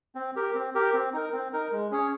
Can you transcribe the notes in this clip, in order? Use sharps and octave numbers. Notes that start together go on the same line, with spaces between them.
C4
G4 A#4
C4
G4 A#4
C4
D#4 A#4
C4
D#4 A#4
G#3
C#4 G#4 C#5